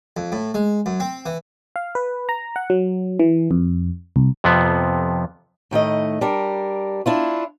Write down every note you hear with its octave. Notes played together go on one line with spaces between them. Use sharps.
F2
A2
G#3
F#2
C4
E3
F5
B4
A#5
F#5
F#3
E3
F2
C2
F2 C3 F3 B3
A2 D#3 A3 D#5
G3 D4 A#4
D4 E4 F4